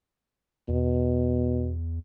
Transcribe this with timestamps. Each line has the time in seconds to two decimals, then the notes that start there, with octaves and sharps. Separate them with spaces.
0.69 E2 B2